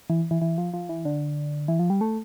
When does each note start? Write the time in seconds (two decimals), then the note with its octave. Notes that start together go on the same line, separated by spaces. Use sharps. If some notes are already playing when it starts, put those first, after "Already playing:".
0.10 E3
0.31 E3
0.42 E3
0.58 F3
0.74 F3
0.89 E3
1.05 D3
1.68 E3
1.79 F3
1.90 G3
2.01 A3